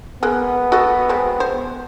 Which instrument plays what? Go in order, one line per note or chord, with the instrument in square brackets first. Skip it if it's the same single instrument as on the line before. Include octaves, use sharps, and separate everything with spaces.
[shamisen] G#3 A#3 [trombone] B3
[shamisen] F#4 A4 D#5
G#3 C4
C5